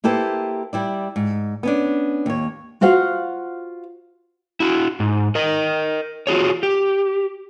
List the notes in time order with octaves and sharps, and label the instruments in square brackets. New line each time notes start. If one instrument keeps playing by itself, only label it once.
[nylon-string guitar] A#3 E4 G4 A4 B4 C5
G3 E4 D5
G#2
B3 C#4 D4
D#2 C#5
F4 F#4 C5 F5 F#5
[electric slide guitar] E4 F#4
G#2
A#4 D#5
F4 F#4 G#4 C#5
G4